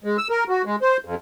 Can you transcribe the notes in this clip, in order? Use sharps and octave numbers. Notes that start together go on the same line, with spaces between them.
G#3
E6
A#4
F#4
G#3
C5
F2